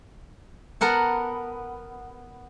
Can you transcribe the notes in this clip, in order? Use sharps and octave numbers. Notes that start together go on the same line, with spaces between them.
B3 A#4 F#5 A5